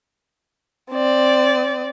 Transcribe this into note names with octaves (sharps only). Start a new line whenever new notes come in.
C4 D5